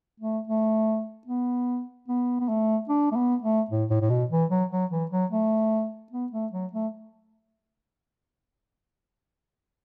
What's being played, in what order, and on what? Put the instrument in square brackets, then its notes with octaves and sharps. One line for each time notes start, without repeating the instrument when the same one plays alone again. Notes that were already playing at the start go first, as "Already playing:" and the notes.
[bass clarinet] A3
A3
B3
B3
B3
A3
D4
A3
B3
A3
A2
A2
A2
B2
E3
F#3
F#3
E3
F#3
A3
B3
A3
F#3
A3